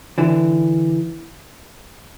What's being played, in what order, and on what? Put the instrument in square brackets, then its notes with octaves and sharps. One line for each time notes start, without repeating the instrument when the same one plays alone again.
[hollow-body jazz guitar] D3 E3